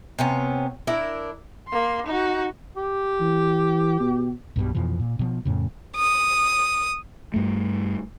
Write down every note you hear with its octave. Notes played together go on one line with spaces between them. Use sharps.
C3 B3 C#4
D4 E4 A#4
A#3 C6
D#4 F#4
G4
E3
B2
B1 G2 B2 G3
F2 B2 E3 F3
A#2
B2 F3
F2 A2 C#3
D#6
G2 A3